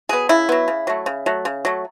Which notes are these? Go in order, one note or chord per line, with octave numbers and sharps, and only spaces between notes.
F#3 B3 G#4
C#3 E4
F#3 B3
C#3
F#3 A3
C#3
F#3 A3
C#3
F#3 A3